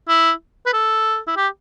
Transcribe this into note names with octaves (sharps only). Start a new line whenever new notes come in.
E4
B4
A4
E4
G4